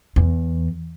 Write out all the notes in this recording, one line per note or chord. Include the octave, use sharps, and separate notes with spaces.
E2